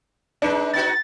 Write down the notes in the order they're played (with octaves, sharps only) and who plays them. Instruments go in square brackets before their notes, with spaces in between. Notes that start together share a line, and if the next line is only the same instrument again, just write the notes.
[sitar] G#3 D#4 [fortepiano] D4 B4
[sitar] B3 D#4 F#4 [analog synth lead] A6